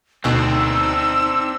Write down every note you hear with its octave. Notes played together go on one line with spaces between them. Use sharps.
D2 B2 C4 D4 D#4 E6